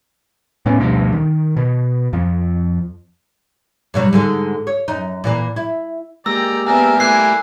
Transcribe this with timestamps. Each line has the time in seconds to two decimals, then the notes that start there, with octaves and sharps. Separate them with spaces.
0.66 A2 B3 C#4
0.79 D2 G2 B2 F3
1.12 D#3
1.57 B2
2.13 F2 F3
3.94 G2 B2 F#3
4.13 G#2 D3 G#3
4.67 C#5
4.88 F#2 D#4
5.24 A#2 E3 A#3
5.56 E4
6.26 G#3 A#3 G4 D5 G5 A#5 E6
6.67 B3 D4 A#4 E5 F5 G#5
7.00 G3 A3 A#3 E4 G4 G#5 F#6 C7